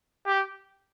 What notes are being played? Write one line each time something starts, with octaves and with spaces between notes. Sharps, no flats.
G4